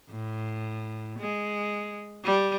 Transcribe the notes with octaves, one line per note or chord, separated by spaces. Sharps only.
A2
G#3
G3